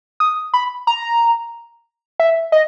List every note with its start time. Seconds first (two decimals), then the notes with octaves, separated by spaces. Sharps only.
0.20 D#6
0.54 B5
0.87 A#5
2.20 E5
2.52 D#5